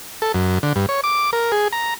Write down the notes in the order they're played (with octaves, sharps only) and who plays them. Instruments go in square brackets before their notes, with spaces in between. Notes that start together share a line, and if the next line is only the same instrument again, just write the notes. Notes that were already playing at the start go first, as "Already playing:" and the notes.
[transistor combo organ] A4
F#2
D3
G2
C#5
D6
A#4
G#4
A#5